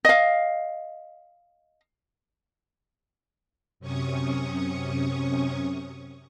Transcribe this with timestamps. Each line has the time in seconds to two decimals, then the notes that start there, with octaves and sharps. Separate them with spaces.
0.05 D#5 F5
3.80 F#2 C3 C#4 C#6 D#6